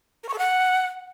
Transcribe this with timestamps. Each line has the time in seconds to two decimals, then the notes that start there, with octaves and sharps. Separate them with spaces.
0.23 A#4
0.28 C#6
0.33 A4
0.38 F#5